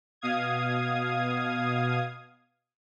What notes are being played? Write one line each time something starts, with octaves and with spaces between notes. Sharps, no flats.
B2 F5 D#6 G#6